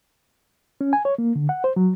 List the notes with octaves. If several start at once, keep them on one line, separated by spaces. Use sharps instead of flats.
C#4
G#5
C#5
A#3
D3
F#5
C5
F#3